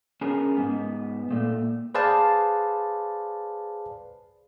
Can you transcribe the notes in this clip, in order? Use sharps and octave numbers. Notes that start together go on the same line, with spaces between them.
C#4 G#4 A#4 B4
G#2 B3
A#2 A3
G#4 B4 C5 D5 F5 A5